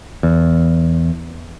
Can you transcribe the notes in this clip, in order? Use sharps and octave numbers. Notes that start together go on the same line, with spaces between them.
E2